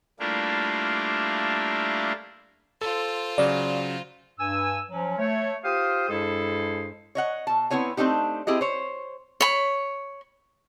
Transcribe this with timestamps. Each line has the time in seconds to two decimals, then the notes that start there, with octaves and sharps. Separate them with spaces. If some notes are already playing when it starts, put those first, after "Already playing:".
0.20 G3 A3 A#3 D4 E4 F4
2.81 F4 A4 C5
3.38 C#3 F#3 D5
4.39 G2 G#5 E6
4.89 F3 F#3 C#4
5.18 A3 C#5
5.64 F4 G4 C5 F5 D#6
6.09 G2 G#3 E4 G#4 A4 C5
7.15 C#5 D#5 F#5
7.47 B2 A5
7.70 B3 C4 E4 C#5 G#5
7.97 A3 C4 D4 D#4 G4
8.47 C4 E4 G4 G#4 D#5
8.61 C5 C#5
9.41 C#5 B5